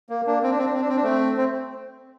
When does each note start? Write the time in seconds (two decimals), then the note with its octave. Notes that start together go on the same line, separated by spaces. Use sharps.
0.09 A#3
0.27 A#3 D4
0.43 C4
0.51 D4
0.58 C4
0.66 D4
0.73 C4
0.81 D4
0.89 C4
0.96 D4
1.03 A3 C4
1.37 C4